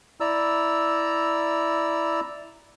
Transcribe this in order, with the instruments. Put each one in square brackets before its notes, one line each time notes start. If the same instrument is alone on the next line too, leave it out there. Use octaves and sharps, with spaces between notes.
[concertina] E4 D5 A#5 E6